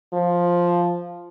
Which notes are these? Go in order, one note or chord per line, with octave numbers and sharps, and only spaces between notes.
F3